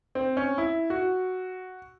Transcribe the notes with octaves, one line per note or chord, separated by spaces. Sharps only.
C4
C#4
E4
F#4